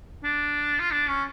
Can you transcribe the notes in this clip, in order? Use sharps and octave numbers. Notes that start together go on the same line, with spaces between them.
D4
F4
D4
C#4